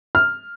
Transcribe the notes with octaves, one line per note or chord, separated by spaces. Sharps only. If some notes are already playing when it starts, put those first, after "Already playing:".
F6